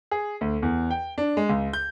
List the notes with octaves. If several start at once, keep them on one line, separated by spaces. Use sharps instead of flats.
G#4
D2
E2
G5
D4
G#3
C#2
G6